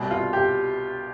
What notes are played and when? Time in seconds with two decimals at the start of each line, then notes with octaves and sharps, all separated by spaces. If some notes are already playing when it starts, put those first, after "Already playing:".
Already playing: C2 B2 G3
0.11 F4
0.33 G4